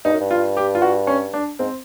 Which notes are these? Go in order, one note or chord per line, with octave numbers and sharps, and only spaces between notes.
G2 D#4
F#2
G2
F4
G4
F4
F#4
C#4
D4
G#2 C4